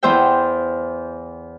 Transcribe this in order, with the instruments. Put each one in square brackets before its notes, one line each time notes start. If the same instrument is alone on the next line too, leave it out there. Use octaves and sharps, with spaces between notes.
[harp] E2 C5 E5 G5